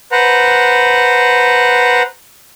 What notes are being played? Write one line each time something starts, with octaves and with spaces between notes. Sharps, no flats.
B4 C5 F#5 A#5